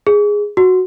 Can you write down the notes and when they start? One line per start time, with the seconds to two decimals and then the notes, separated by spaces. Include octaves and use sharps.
0.07 G#4
0.57 F#4